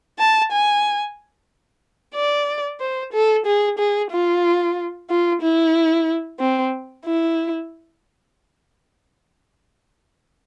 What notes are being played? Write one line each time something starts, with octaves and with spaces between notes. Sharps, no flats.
A5
G#5
D5
C5
A4
G#4
G#4
F4
F4
E4
C4
E4